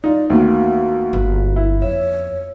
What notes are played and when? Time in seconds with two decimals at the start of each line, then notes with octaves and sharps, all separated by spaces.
0.04 D#4 F4 D5
0.30 D2 D#3 A#3 B3 F4 F#4
1.13 G1 B4
1.56 E4
1.82 F2 C#5 E5